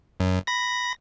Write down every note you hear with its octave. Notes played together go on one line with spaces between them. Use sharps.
F#2
B5 A#6